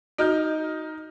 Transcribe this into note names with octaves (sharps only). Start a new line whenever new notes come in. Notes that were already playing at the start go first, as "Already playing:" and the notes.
D#4 F#4 F6 G6